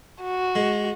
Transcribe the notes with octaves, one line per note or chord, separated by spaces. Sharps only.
F#4
G#3